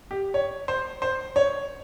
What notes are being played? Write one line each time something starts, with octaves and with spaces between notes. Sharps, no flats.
G4
C#5
C5
C5
C#5